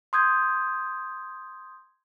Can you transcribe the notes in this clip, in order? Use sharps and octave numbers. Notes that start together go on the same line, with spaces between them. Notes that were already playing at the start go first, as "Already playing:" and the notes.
C6 D#6 G6 G#6